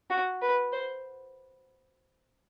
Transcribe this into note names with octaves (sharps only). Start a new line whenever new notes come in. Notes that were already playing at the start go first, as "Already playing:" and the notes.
F#4
B4
C5